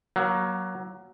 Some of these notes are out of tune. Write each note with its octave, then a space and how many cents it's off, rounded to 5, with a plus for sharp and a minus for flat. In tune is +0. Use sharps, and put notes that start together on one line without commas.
F#3 +15 A#3 +30